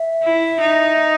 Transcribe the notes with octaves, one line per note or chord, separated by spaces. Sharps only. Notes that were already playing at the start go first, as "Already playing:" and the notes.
Already playing: E5
E4
D#4